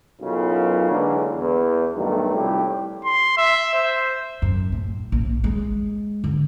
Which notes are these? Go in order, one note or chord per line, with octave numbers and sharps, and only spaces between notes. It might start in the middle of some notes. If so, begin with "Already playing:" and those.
B1 F#2 C#3 E3 F4
D3 E3 F#3 G#3 A#3
E2
B1 G2 D#3 F#3 A3
C2 F2 A2 G3 G4
C6
E5
C5
F#2
A2
A#1
G#3
D3